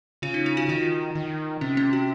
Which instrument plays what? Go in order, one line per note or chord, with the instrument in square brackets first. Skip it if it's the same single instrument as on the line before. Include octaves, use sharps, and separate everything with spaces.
[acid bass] C#3 [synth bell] F4
[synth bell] D#4
F4
F#4
[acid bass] D#3 [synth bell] F4
[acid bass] D#3
[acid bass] C3 [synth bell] C#4
[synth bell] C#4
F#4